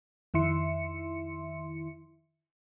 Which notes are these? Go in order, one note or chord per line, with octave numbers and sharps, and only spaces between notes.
F2 D#3 E4 E5 C6 C#7